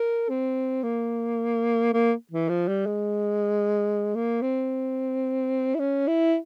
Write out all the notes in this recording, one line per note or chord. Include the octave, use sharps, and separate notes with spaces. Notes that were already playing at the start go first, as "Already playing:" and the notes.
Already playing: A#4
C4
A#3
A#3
E3
F3
G3
G#3
A#3
C4
E4
C#4
E4